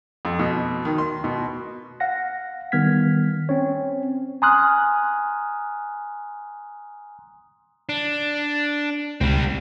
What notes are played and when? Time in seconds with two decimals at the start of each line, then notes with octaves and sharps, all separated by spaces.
0.25 F2
0.39 B2
0.85 D#3
0.98 C6
1.24 B2
2.00 F5 F#5 A#6
2.72 D#3 G3 B3 F6 G#6 B6
3.49 C4 C#4 C#5
4.42 G#5 A#5 C6 D#6 F6 F#6
7.89 D4
9.21 C#2 B2 G3 C4